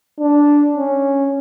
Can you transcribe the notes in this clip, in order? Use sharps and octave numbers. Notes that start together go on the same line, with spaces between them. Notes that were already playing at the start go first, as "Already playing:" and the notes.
D4
C#4